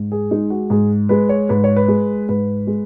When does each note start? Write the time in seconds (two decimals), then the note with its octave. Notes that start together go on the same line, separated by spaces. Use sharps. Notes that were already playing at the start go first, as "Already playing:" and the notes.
Already playing: G#2
0.12 G#4
0.31 G#3 D#4
0.50 F#4
0.70 G#2 G#4
1.09 G#3 B4
1.29 C#5
1.49 G#2 B4
1.64 C#5
1.76 B4
1.88 G#3
2.29 G#2 B4
2.67 G#3